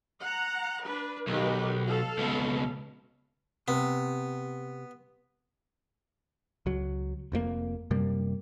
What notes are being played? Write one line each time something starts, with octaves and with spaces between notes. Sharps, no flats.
F#5 A#5
D4 B4
B1 D#3 G4 B4
A4 F5
C#2 B2
C3 B3
C#2 F#3
F1 F2 G#2 A#3
F#2 C3 G3 A#3